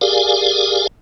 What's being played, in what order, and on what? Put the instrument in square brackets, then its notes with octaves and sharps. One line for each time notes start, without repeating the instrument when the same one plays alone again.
[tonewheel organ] G4 G#4 A#4 D5 F5 G#5